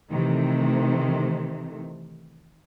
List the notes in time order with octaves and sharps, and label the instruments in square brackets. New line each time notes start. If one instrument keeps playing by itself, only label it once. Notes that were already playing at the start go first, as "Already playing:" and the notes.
[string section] C3 D#3 E3 A3